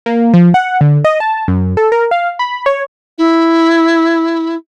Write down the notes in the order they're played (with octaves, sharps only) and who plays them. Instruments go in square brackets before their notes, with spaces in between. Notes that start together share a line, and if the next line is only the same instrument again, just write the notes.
[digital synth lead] A#3
F3
F#5
D3
D#5
A5
F#2
A4
A#4
F5
B5
C#5
[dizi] E4